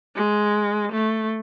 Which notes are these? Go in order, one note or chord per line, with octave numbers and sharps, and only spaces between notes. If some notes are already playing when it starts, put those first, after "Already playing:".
G#3
A3